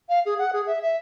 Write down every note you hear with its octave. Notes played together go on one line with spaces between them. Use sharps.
F5
G#4
F#5
G#4
E5
E5